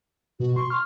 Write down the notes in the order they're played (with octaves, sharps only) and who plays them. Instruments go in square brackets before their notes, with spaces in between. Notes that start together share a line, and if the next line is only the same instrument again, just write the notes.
[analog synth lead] B2 [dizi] F#4
[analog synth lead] C6 [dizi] C#6
[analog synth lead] F6